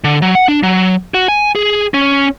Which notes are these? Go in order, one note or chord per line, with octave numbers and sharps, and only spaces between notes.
D3
F#3
F#5
D4
F#3
F#4
G#5
G#4
C#4